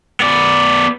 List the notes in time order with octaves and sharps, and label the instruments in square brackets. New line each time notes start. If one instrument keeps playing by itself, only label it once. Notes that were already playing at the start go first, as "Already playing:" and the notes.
[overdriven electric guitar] B3 D5